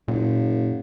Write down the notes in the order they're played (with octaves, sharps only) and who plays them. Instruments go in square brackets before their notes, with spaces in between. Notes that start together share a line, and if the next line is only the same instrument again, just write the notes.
[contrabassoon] F#1 [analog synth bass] A#2